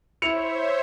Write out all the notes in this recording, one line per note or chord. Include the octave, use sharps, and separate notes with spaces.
E4 C5 C#5 E5 C#7 F7